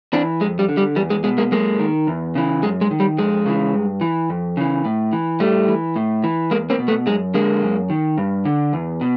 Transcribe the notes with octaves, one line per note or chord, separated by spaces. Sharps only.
E3 C4 D4
F2 G#3
G3
D3
G3
E2 G3
G#3
B2 G#3
G#3 A#3
F#2 G#3 A#3
D#3
E2
C#3 E3
F#2 G#3
G#3
D#3
G3
F2 G#3
C#3 E3
G2
E3
F2
C#3 E3
A2
E3
A2 G3 A3
E3
A2
E3
E2 G#3 A#3
A#3 C4
B2
A3 B3
F#2 G#3
D3 G#3 A#3
F#2
D#3
G2
D3
E2
B2